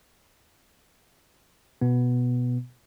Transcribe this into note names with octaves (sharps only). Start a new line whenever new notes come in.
B2 B3